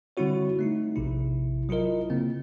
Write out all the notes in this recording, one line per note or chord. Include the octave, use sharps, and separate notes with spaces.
D3 G3 C4 E4 F#4 C#5
A3 D#4 E4
A#1 C3 E4
F#3 E4 F4 A#4 D#5
C#3 A#3 C4